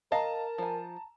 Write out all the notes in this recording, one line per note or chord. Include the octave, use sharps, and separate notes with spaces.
A#4 D#5 F5 A5 A#5
F3 G#5